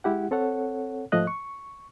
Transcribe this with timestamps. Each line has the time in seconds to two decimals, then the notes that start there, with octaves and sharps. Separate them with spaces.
0.04 G#3 E4 G4 F#5
0.31 C4 A4 C#5 F#5
1.12 G#2 F3 A3 D#5 F#6
1.27 C#6